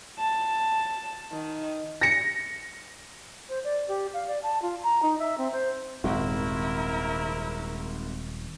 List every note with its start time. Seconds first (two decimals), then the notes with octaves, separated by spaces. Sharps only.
0.19 A5
1.32 D#3
2.01 A#6 C#7
3.49 C5
3.64 D5
3.88 G4
4.13 F5
4.27 D5
4.43 A5
4.62 F4
4.83 A#5
5.03 D#4
5.19 E5
5.38 C4
5.52 C5
6.04 D#1 G#1 E4 A#4